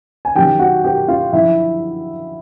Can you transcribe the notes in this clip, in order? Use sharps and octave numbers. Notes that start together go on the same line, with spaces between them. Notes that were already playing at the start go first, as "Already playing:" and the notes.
G#5
F#2 D#3 G4 G5
F#4 F#5
G4 G5
F4 F5
F#2 D3 F3 E4 E5